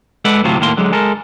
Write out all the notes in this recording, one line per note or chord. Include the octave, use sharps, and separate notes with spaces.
G#3 A4 B4 D5 F#5
D2 A2 C3 F#3 F4
D#2 A2 A#3 C6
D3 F#3 G#3
G#3 A4 A#4